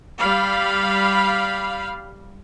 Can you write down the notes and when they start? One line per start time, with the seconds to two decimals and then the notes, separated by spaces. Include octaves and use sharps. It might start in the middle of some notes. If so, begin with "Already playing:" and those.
0.19 G3 F5 B5